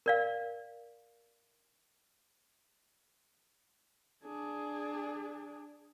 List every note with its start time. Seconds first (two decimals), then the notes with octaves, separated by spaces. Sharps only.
0.06 A#4 D5 F5
4.24 D4 G#4